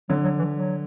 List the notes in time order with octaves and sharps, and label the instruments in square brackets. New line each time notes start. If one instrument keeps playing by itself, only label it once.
[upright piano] D3 [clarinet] F#3
[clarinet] F#3
E3
F#3